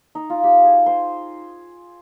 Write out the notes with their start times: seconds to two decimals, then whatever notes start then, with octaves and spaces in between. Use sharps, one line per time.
0.15 D#4
0.30 F4
0.44 G4
0.65 G#4
0.86 C5